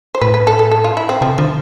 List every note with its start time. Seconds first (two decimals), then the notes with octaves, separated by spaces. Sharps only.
0.15 C5
0.21 A2 B4
0.34 B4
0.47 A4
0.59 A4
0.71 A4
0.84 F4
0.97 E4
1.09 C4
1.21 C3 F3
1.38 D3 F3